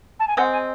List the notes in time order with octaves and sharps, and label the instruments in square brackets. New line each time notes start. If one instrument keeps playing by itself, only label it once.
[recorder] A5
G#5
[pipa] G#3 C4 [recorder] F#5
[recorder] G#5